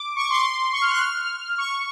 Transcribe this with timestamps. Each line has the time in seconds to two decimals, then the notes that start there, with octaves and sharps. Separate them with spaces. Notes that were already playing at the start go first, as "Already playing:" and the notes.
Already playing: D6
0.16 C#6
0.30 C6
0.72 C#6
0.82 F6
0.91 F#6
1.01 F6
1.58 C#6